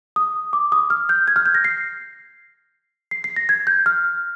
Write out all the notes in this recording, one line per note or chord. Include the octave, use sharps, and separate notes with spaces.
D#6
D6
D#6
F6
G6
G#6
F6
G6
A#6
C7
C7
C7
A#6
G#6
G6
F6